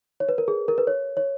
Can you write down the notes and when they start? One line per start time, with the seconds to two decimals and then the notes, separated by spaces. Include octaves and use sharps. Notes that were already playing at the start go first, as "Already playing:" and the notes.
0.20 C#5
0.29 B4
0.38 A#4
0.48 G#4
0.68 A#4
0.78 B4
0.87 C#5
1.17 C#5